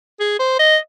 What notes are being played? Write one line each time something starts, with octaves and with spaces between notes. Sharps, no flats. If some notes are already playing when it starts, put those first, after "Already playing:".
G#4
C5
D#5